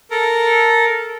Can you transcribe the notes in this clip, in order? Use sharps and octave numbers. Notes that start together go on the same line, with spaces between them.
A4 A#4